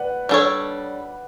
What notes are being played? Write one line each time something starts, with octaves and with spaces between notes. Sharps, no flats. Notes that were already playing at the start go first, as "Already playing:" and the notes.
Already playing: B4 D5 F#5
G3 D4 A4 C#5